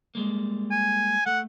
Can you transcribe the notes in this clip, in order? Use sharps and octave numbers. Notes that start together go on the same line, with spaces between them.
G3 G#3 A#3
G#5
A3 F#5